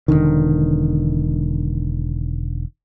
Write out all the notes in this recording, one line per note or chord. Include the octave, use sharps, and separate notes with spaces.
E1 D#2 D3 D#3